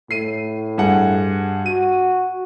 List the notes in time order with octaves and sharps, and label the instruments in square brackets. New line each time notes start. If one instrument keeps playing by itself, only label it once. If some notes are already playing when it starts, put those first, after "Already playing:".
[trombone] A2 [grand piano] C7 D#7
[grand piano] G2 G#4 F#5
[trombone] F#4 [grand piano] D#7